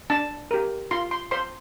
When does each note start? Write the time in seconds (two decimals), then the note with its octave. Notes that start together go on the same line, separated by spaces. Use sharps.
0.10 D4 A5
0.51 G4 A#4
0.91 F4 C6
1.11 C6
1.31 C5 C6